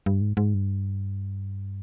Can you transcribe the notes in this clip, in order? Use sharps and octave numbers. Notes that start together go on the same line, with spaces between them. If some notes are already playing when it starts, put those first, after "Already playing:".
G2
G#2
G#2
G2